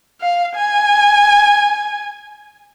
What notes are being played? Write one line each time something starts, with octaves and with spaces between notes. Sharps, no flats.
F5
G#5